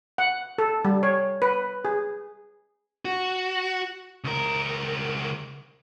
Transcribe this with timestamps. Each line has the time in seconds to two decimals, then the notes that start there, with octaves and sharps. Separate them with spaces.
0.18 F#5
0.58 A4
0.85 G3
1.03 C#5
1.42 B4
1.85 G#4
3.05 F#4
4.24 C#2 A#4